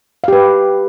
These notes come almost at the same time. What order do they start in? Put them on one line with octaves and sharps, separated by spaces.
F5 G4 B4